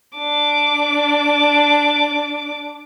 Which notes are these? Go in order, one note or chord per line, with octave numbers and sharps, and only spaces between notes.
D4 D6